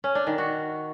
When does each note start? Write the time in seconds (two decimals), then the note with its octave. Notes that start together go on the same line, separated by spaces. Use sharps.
0.04 C#4
0.15 D4
0.27 D#3
0.38 F#4